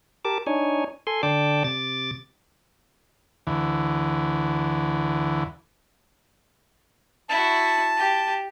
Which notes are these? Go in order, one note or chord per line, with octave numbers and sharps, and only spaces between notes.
G4 A#4 A5 D6
D4 D#4 C#5 G#5
A4 G#5 C6
D3 D5 G5 A5 D6
C3 D6 A6
D2 E3
E4 F#4 A5
G4